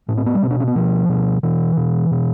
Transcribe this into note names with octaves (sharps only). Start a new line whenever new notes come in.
A2 C#4
C4
B3
G3
B2 C4
D4
C#4
B3
B2 F3
B2
B2 E3
B2
B2